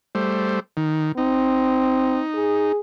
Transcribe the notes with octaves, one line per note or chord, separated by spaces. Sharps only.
G3 A3 C5
D#3
C4 D#4
G#4